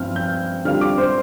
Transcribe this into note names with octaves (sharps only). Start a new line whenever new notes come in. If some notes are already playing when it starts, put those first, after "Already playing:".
Already playing: G2 F3 C4 F6
G6
D3 G3 C4 F4 F6
D6
C5